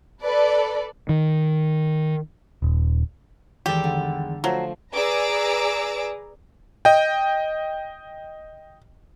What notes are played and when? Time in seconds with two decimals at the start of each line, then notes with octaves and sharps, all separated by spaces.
0.23 A4 B4 D5
1.09 D#3
2.62 D#1
3.66 E2 D#3 G3 G#3 G4 A4 A5
3.84 D3
4.44 F3 F#3 A3 C5
4.94 G#4 B4 D5 A#5 D6 E6
6.85 D#5 G5